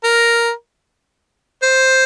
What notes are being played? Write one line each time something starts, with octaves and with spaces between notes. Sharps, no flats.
A#4
C5